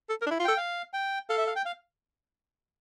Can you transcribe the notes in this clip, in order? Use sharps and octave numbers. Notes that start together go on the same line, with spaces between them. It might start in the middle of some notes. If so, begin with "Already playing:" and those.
A4
A#4
D4
E4
F4
A4 G5
F5
G5
A4 F5
E5
F5
G5
F5